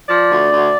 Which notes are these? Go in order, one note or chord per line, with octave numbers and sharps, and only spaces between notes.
F3 D5
D2
D2